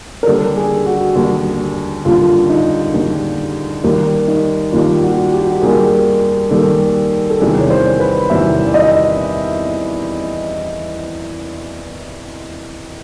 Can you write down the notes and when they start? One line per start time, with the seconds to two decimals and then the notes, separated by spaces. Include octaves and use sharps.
0.23 A#4
0.26 D#2 D3 G3 A4
0.56 G#4
0.86 F#4
1.16 D#2 D3 G3
2.05 D#2 D3 G3 F4
2.50 D#4
2.94 D#2 D3 G3
3.84 D#2 D#3 G3 A#3
4.28 D#4
4.72 D#2 D#3 G3 A#3 F4
5.02 F#4
5.32 G4
5.42 F#4
5.52 G4
5.62 D#2 D#3 G3 A#3 G#4
6.51 D#2 D#3 G3 A#3 A4
7.30 A4
7.40 E2 C3 D#3 G3 C4 G#4
7.59 C#5
7.70 C5
8.00 B4
8.29 E2 C3 D#3 G3 C4 E5
8.66 D5
8.74 D#5